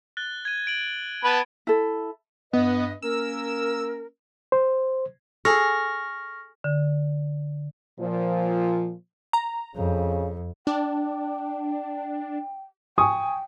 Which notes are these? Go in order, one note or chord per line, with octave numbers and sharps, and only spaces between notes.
F#6 A6 G7
G#6 D#7
D7 F#7
B3 B4 A5
E4 A4
G2 B3 B4 D#5
A#3 C#4 A#4 E6
C5
G#4 A4 C#6 F6 A#6
D3
A#2 F3
A#5
F2 C#3
D4 G5
G5 G#5 C#6 D#6